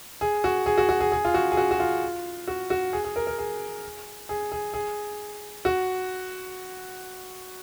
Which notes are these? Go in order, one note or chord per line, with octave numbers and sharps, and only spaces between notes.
G#4
F#4
G#4
F#4
F#4
G#4
G#4
F4
F#4
G#4
F#4
F#4
F4
F#4
F#4
G#4
G#4
A#4
A#4
G#4
G#4
G#4
G#4
F#4